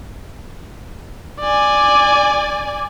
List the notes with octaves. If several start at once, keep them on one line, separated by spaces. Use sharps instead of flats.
D5 G#5